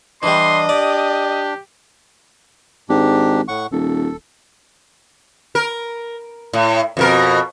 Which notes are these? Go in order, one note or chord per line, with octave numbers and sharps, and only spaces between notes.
E3 G3 D4 D#5 C6
G4 D5
G#1 G#2 D4 G4
A2 F#5 C#6
D#1 A4
A#4
A2
F2 B2 A#4